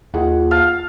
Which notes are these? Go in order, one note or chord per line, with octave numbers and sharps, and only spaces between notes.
D#2 F4 G#4 F#5
F5 A5